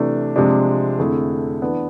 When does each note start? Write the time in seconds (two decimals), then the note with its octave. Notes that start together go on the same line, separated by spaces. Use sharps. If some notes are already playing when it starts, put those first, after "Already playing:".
Already playing: C3 E3 A3 D4
0.36 C3 F3 G#3 D4
0.99 F2 D3 A3 E4 G#4
1.62 E3 B3 D4